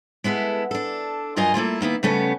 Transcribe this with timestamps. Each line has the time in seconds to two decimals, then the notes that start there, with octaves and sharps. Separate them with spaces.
0.24 G#3 B3 E4 A4
0.71 D4 A4
1.36 G2 F#3 F4 A#4 D#5 G#5
1.54 A3 A#3 E4 F4
1.81 D#3 A#3 B3 E4
2.03 C#3 G3 A3 B3 C#4